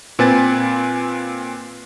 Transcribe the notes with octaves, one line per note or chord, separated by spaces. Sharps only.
A#2 C4 B4 G#5 A6